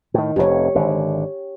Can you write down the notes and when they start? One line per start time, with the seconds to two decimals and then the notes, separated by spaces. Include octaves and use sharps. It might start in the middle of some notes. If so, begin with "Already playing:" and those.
0.14 A2 D#3
0.36 F1 F2 G4 C#5
0.75 G#1 D3